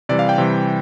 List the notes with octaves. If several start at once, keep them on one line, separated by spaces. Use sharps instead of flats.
C3 E3 G3 D5
F5
G5
C3 E3 G3